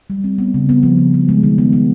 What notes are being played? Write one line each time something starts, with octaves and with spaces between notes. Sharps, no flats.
G3
C4
B3
C#3
B3
F3
C#3
B3
G#3
D#3
B3
B3